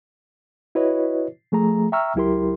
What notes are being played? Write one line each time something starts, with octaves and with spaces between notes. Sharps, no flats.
E4 F#4 B4 C#5 D#5
F3 A3 G#4 A#5
E5 G5 A#5 C#6 E6 F6
C#2 F#3 E4 G4 A#4 C6